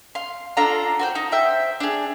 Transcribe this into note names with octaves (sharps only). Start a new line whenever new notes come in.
F5 C6
D4 F4 A4 A#5
F#4 C5 G5
D#4
C5 E5 G5
D4 G#4